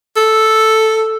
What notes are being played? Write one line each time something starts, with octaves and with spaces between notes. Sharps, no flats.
A4